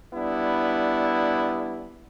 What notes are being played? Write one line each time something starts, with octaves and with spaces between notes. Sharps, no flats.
G3 B3 D4 E4